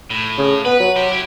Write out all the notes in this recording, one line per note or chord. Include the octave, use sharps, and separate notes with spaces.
A2
C#3
B3 B4
F#3
G4 C5
E4 G4